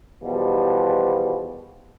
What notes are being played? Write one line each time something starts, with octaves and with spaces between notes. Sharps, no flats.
E2 B2 D#3 F3 G3 F#4